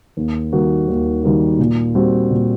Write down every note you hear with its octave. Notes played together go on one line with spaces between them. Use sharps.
D#2
D#3 G3 A#3 F#4
D#2
D#3 G3 A#3 F#4
A#2
G3 C4 F#4
A#2